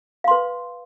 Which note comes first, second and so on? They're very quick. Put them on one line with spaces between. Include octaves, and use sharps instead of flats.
F5 C6 B4